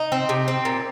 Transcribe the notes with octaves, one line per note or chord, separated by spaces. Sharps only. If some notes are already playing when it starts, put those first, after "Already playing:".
Already playing: D#4
C4
C3
C4
A#2